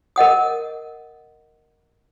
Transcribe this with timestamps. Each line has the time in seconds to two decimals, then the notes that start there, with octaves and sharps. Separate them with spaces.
0.16 A#4 D#5 F#5 D#6